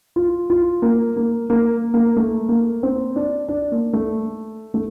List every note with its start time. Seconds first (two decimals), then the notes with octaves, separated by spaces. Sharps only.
0.16 F4
0.50 F4
0.82 A#3
1.17 A#3
1.50 A#3
1.94 A#3
2.16 A3
2.49 A#3
2.83 C4
3.16 D4
3.49 D4
3.72 A#3
3.93 A3
4.74 A3